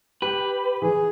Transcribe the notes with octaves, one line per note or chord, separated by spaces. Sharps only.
G4 B4
E3 G#4